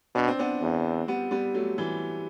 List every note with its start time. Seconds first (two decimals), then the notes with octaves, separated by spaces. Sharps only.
0.15 B2 D4
0.28 C4
0.39 B3 D4
0.62 E2
1.08 G3 B3
1.31 G3 B3
1.54 F#3 A3
1.78 E3 G3